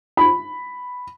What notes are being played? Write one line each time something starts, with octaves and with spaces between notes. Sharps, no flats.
B5